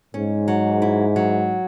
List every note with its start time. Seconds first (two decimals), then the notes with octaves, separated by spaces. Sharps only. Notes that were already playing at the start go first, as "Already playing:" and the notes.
0.14 G#2 C#4
0.48 F#3
0.82 E4
1.16 F#3